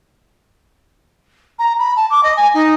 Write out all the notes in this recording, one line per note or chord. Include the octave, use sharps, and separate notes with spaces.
A#5
B5
A5
D6
D#5
G#5
D#4